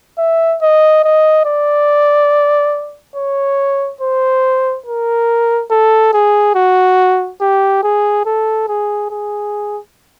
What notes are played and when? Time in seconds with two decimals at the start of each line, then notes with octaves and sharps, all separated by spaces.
0.18 E5
0.62 D#5
1.04 D#5
1.46 D5
3.16 C#5
4.01 C5
4.86 A#4
5.71 A4
6.13 G#4
6.55 F#4
7.41 G4
7.83 G#4
8.26 A4
8.68 G#4
9.11 G#4